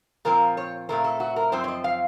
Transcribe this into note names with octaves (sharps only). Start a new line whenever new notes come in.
A#2 F3 C4 A#4
C#5
A#2 A3 C4 A#4
A4
F#4
A#4
F#2 F3 C4 C5
C#5
D#5
F5